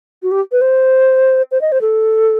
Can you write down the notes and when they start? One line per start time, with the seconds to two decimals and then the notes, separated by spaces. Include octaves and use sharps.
0.23 F#4
0.31 G4
0.52 B4
0.61 C5
1.51 C5
1.61 D#5
1.72 C5
1.81 A4